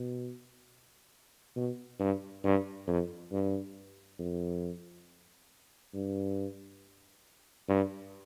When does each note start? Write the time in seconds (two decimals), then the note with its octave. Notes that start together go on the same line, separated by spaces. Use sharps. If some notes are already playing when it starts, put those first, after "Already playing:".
Already playing: B2
1.56 B2
1.99 G2
2.44 G2
2.87 F2
3.32 G2
4.19 F2
5.94 G2
7.69 G2